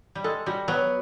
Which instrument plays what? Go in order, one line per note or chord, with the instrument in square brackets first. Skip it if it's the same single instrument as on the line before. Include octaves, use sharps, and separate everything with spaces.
[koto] G3
[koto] G#3 [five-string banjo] A4
[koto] G3 [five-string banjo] F#4
[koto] F#3 [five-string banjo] B3